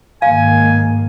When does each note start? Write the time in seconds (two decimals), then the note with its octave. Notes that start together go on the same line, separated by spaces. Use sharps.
0.22 G#2 D#3 A#3 F5 G#5